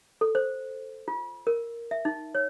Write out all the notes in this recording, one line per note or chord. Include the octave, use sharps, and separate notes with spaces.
A4
C5
F4
A#4
E5
D#4
C#5